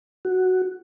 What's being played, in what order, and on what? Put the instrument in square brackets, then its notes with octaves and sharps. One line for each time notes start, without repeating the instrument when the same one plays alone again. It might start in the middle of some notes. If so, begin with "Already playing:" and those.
[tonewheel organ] F#4